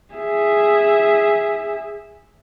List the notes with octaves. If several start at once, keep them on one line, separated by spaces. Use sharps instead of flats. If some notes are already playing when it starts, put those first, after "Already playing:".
G#4 E5